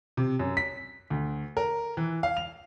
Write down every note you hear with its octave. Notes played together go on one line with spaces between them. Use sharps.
C3
F#2
B6
D2
A#4
E3
F5
F7